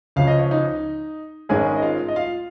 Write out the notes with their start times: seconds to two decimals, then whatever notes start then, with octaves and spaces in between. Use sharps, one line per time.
0.16 C#2 C#3 F3 C#4 F5
0.27 D#5
0.39 C#5
0.51 D#4 D#5
1.49 G#1 G#2 G#3 C#4 G#4 G#5
1.76 D#5
1.82 F4 F5
2.08 D#5
2.16 F4 F5